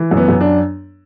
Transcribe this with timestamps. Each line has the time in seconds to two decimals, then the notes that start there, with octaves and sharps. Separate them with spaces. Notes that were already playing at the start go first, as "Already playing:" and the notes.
Already playing: E3
0.11 F#2
0.17 B3
0.28 F#2
0.41 D4